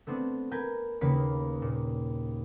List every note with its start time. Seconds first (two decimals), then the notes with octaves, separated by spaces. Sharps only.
0.07 A3 B3 C4 D4
0.51 A#4 B4 G#5 G6
1.01 D#2 C#3 A#3 B4 B5 C#7
1.62 A#2